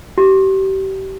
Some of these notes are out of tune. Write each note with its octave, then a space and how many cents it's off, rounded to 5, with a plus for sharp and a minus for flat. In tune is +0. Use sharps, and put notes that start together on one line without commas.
G4 -30